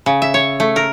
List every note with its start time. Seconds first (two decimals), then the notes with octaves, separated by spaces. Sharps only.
0.06 C#3
0.22 E5
0.34 C#5
0.60 A3
0.76 A#4